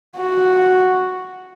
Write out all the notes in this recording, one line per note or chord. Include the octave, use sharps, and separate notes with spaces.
F#4